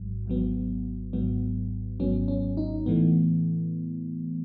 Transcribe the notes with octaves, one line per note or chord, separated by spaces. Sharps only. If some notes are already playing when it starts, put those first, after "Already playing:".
Already playing: G#1 G#2 F#3
G#1 G#2 F#3 B3
G#1 G#2 F#3 B3
G#1 G#2 F#3 B3 C#4
C#4
D#4
A2 E3 A3 B3